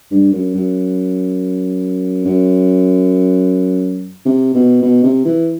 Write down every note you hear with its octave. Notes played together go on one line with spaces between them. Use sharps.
G2
F#2
F#2
F#2
C3
B2
B2
C3
E3